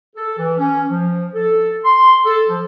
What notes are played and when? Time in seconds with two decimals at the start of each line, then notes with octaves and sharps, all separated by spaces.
0.16 A4
0.38 E3
0.58 C#4
0.89 F3
1.34 A4
1.85 C6
2.25 A4
2.49 F3